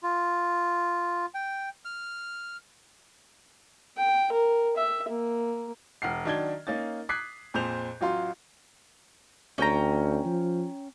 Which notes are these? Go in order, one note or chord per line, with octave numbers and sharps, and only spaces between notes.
F4
G5
F6
G5
A#4
E5
A#3
E1 F#5 F6 C7
D#3 F#3 D4 D5 G#6 G7
A#3 C#4 D#4 A6
D6 D#6 F#6 G#6 B6 C7
F2 A#2 G#4 C5 G6 F7
A1 F#3 F4 C6
D2 C#4 G5 A#5
F3